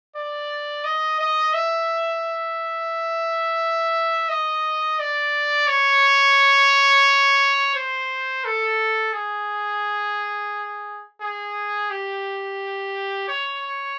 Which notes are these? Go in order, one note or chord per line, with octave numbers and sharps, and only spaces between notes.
D5
D#5
D#5
E5
D#5
D5
C#5
C5
A4
G#4
G#4
G4
C#5